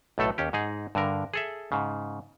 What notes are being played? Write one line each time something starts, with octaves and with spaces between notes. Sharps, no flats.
B1 A2 A3 A4
D#2 C#4 G4
G#2 D#4 G#4
G2 D3 A#4
G#4 A4 E5
G#2 C#3